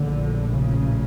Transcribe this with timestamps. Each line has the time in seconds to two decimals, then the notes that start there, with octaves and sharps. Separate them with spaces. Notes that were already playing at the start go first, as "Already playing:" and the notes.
Already playing: A#1 A2 D3
0.50 C#3